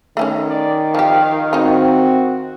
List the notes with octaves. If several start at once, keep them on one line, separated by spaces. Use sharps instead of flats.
D#3 A3 B3 C#4
D5
F3 G4 F5
C4 D#4 F4 F#4